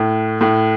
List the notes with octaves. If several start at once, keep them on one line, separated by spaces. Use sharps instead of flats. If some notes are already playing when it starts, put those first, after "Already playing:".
Already playing: A2
A2